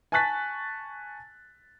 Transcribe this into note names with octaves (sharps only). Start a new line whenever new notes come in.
G#5 A5 C#6 F#6 A6 B6